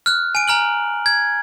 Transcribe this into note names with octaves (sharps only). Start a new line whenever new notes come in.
F6 F#6
G#5 D7
G#5 A#5 F6 F#7
G#6